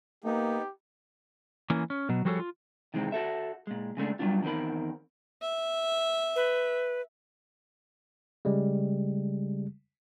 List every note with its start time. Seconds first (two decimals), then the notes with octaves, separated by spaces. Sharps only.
0.24 A#3 B3 D#4 G4
1.70 E3 A#3 C#4
1.90 C#4
2.09 B2 F#3
2.25 F3 G3 F#4 G#4 A4 C#5
2.39 F4
2.94 C3 D#3 E3 G#3 C4
3.12 F#4 A4 E5
3.67 A#2 G#3
3.97 C#3 G#3 A3 D4
4.19 F#3 G3 A3 B3 D4 F4
4.43 E2 D#3 C4 A#4 B5
5.42 E5
6.36 B4
8.45 C#3 G3 G#3